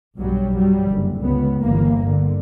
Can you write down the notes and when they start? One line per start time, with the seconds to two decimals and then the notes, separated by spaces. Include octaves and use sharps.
0.17 B1 G2 F#3 G3
0.55 G2 F#3 G3
0.89 F#1 D3
1.20 C#2 B3
1.61 G1 G2 E3 A#3
2.04 D3